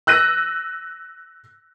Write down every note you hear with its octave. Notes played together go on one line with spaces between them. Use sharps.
E6 F#6 A#6 D#7